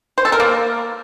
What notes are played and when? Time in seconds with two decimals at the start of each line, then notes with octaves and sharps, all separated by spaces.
0.18 C5
0.25 A4
0.32 A#4
0.40 A#3